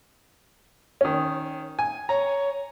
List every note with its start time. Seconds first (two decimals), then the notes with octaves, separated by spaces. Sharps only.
1.01 D#3 C#4
1.79 G#5
2.09 C#5 A#5